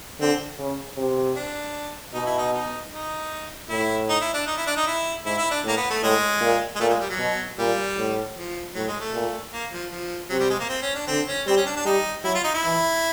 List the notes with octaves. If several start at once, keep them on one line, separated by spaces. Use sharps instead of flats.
D3 C4
C#3
C3
D4
B2 D#4
E4
D#4
D#4
D#4
A2 E4
D#4
E4
D4
D#4
E4
D4
D#4
E4
G#2 E4
E4
D4
A2 A#3
B3
A3
A2 G#3
A#2
G#3
A#2 A3
G#3
G3
F#3
B2
A#2 G3
A2
F3
A2 F#3
G#3
A3
A#2
A#3
F3
F3
C3 F#3
G3
G#3
A#3
C4
C#4
D4
D3 C4
C#4
G3 C4
C#4
D4
D4
G3 D#4
F#3 E4
F4
D#4
E4
E3